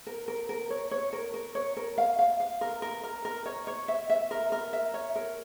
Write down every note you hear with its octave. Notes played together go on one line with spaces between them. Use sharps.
A#4
A#4
A#4
C#5
C#5
A#4
A#4
C#5
A#4
F5
F5
F5
A#4
A#4
A#4
A#4
C#5
C#5
E5
E5
A#4
A#4
E5
C#5
A#4